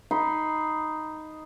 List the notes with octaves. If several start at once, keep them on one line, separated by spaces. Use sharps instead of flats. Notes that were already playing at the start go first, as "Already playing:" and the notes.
D#4 B5 C6